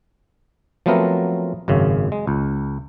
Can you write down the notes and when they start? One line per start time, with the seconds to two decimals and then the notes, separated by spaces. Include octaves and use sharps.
0.86 F3 F#3 A3 B3 C4 A#4
1.68 G#1 F#2 C#3
2.12 G#3
2.27 C#2